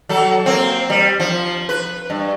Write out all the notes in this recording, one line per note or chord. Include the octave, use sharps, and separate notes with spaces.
F#3 A4
A#3 C4
G3
F3
B4
G2